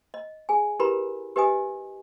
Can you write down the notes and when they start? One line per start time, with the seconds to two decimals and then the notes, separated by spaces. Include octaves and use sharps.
0.14 D#5
0.49 G#4 G#5
0.80 E4 G4 A#4 B4 A#5 B5
1.36 G4 B4 D#5 G#5 D#6